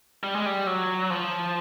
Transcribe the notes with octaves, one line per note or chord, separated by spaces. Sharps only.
G3
G#3
G3
F#3
F3